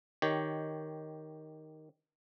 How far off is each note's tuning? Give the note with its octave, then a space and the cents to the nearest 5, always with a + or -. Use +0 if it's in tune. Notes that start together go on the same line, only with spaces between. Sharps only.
D#3 +0 G4 +0 C#5 +0